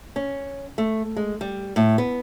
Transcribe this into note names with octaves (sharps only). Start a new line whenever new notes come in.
C#4
A3
G#3
G3
A2
B3